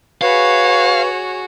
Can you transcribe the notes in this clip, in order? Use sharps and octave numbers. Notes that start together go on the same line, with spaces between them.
F#4 G#4 B4 C#5 F5